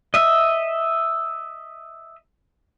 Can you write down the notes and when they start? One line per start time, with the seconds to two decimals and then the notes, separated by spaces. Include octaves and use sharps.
0.14 D#5 E5